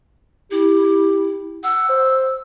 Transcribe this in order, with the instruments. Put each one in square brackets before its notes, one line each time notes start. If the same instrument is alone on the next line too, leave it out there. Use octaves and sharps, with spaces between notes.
[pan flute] E4 [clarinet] G4
[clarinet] F#5 [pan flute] E6
[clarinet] C5